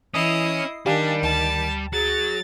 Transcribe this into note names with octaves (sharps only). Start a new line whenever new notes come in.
E3 C#4 E4 D#5 D#6 C7
D#3 G3 D4 G4 F5 G#5
D2 A5
F#3 G#4 A6